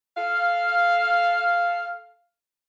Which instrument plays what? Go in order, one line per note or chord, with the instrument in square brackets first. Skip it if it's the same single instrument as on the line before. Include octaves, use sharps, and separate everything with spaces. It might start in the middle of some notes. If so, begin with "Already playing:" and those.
[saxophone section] A4 F5